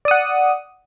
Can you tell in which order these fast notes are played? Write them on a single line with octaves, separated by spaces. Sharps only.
D5 D#6 F#5